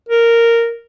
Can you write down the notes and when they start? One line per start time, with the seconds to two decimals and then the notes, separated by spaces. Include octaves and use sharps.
0.09 A#4